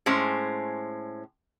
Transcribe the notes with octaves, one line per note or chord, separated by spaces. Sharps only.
A2 G#3 C#4 C5